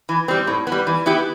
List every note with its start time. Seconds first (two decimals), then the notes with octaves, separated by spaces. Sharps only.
0.09 E3
0.28 G3 C4
0.47 A2
0.67 G3 B3
0.87 E3
1.06 B3 E4 G4